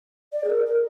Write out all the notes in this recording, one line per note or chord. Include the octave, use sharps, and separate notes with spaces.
D5
G#4
A#4
A#4